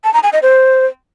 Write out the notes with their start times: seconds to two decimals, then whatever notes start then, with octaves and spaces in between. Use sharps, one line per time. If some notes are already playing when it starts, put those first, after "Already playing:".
0.04 A5
0.14 A#5
0.23 G#5
0.33 D#5
0.42 C5